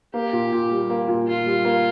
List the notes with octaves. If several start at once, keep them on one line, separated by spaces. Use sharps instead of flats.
A#3 G4
A#2
A#2
G3
A#3
A#2
A#2 F4
G3
A#3